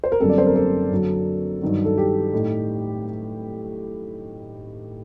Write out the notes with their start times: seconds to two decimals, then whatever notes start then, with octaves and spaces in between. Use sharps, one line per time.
0.04 C5
0.12 A#4
0.20 F#1 F#2 D3 G3 C4 A4
0.29 D5
0.38 C5
0.47 A#4
0.56 A4
0.91 F#2 D3 F#3
1.61 G2 D#3 F#3
1.85 A4
1.98 G4
2.33 A2 A3 D#4